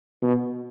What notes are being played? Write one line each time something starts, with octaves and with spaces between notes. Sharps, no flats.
B2